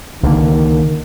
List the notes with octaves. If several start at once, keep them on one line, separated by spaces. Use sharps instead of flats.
C#2 D3 D#3 A#3